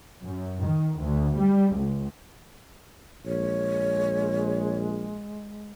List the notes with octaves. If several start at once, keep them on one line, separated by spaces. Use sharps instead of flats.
F#2
D#3
D2
G3
C#2
A#1 G#3 C#5